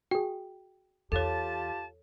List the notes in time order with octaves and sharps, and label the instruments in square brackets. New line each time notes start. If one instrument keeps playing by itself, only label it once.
[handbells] F#4 G#4 [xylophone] G5
[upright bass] E2 [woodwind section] F4 G4 A5 [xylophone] A4 C#5